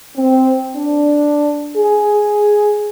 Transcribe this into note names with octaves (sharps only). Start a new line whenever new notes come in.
C4
D4
G#4